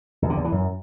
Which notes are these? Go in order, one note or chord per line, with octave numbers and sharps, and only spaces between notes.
E2
D3
E2
E3
F#2